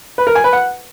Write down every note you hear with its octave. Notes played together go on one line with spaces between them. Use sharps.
B4
A#4
G#5
B4
F#5